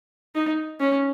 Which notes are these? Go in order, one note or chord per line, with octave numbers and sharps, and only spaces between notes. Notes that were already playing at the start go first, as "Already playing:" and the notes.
D#4
C#4